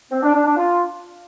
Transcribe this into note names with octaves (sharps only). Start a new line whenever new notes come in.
C4
D4
D4
D4
F4